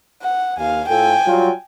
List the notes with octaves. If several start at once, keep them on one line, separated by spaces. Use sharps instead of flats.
F#5
D#2 F5 G#5
A2 F4 A4 G5 G#5
F#3 G3 F4